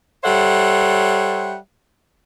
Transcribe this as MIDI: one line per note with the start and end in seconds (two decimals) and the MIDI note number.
0.24 1.56 55
0.24 1.56 69
0.24 1.56 72
0.24 1.56 73
0.24 1.56 76
0.24 1.56 78